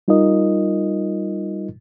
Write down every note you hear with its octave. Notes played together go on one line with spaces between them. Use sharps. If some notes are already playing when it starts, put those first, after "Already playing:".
G3 D#4 F4 A#4 D#5